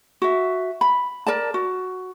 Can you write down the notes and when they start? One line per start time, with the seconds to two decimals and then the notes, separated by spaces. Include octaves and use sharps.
0.22 F#4 E5
0.81 B5
1.27 A#4 D5 A5
1.54 F#4